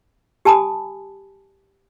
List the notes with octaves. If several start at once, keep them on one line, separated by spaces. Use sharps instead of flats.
G4 G#5 A5 B5 D#6